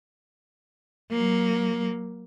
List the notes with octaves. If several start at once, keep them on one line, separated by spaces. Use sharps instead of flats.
F#3 A#3